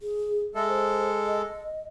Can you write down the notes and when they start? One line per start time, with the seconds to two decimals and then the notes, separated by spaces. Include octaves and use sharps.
0.01 G#4
0.55 G#3 A4 E5
0.69 C5
1.26 D#5